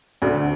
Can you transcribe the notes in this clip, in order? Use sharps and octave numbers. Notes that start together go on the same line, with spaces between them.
D2 D3